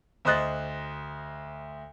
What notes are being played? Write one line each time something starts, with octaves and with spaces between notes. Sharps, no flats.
D2 C5 D#5 F#6 A6